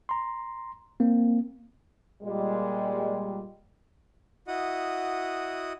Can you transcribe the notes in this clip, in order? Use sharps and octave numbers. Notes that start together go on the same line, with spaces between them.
A#5 C6
A#3 C4
A#2 G3 G#3
E4 F#4 D#5 F#5 D#6